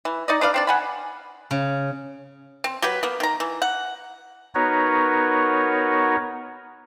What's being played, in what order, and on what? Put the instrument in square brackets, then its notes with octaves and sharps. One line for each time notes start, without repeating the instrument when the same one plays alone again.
[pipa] E3
D#4 D5 D#5
D4 B4 D5 F5
C4 D4 D5
F#5 G#5 B5
[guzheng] C#3
[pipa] C4
F#3 G4 B4
A#3 B3
D#3 A#5
E3
F#5
[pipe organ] B3 D#4 F#4 A#4 B4 C#5